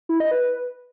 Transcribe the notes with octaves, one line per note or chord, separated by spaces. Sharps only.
E4
D#5
B4